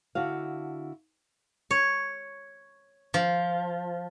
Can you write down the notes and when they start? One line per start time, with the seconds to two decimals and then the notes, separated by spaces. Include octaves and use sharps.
0.15 D3 E4 F#4 F5
1.71 C#5
3.14 F3